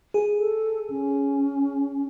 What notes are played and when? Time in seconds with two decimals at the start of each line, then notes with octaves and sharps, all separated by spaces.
0.14 G#4
0.37 A4
0.90 C#4